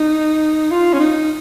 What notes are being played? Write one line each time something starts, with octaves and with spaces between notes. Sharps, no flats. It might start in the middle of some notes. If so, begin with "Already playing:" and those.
Already playing: D#4
F4
C#4
D#4